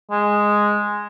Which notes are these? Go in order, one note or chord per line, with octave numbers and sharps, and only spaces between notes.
G#3